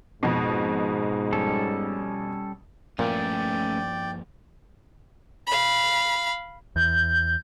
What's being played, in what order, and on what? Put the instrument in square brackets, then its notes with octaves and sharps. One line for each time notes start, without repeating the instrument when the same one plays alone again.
[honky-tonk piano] F2 B2 [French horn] G#2
[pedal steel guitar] G3 C#4 A4
[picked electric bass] G2 F3 A#3 [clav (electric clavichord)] A#2 [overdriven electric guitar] A3 C#4 [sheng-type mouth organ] D5 G5
[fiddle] F5 B5
[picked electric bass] E2 [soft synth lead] G6